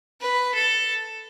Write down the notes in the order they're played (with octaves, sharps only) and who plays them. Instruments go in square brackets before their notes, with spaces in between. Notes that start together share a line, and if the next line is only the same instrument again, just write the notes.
[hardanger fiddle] B4
A4